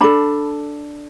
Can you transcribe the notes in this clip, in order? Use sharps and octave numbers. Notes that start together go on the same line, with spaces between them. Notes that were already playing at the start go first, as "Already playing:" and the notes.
D4 A4 B5